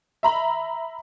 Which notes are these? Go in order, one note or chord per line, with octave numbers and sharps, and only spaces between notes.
E5 A#5 B5